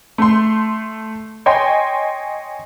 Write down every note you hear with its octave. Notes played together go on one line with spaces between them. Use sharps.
A3 C6
C#5 D#5 G5 G#5 C6